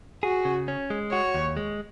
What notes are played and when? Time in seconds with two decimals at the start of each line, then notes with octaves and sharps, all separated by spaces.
0.23 F#4 G#4
0.45 C#3
0.68 C#4
0.90 G#3
1.12 F#4 C#5
1.35 D#2
1.57 G#3